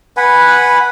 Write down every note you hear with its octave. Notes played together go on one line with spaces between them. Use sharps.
B4 F#5 G#5 B5